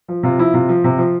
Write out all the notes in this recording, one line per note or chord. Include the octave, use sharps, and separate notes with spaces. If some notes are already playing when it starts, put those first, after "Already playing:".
F3
C3 F4
F3 E4
C3 F4
F3
C3
F3